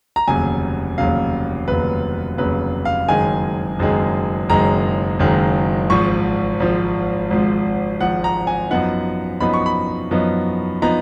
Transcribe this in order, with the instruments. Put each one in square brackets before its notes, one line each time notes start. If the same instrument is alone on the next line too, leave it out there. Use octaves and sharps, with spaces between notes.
[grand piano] A#5
F1 D#2 C#3 F#3 G#5
F1 D#2 C#3 F#3 F5
F1 D#2 C#3 F#3 B4
F1 D#2 C#3 F#3 B4
F5
F#1 F#2 D#3 G#3 G#5
F#1 F#2 D#3 G#3
F#1 F#2 D#3 G#3 A#5
F#1 F#2 D#3 G#3
G#1 G#2 F3 C#6
G#1 G#2 F3
G#1 G#2 F3
G#1 G#2 F3 F#5
A#5
G#5
F#2 F3 B3 D#4 F#5
F#2 F3 B3 D#4 B5
C#6
B5
F#2 F3 B3 D#4
F3 B3 D#4 A#5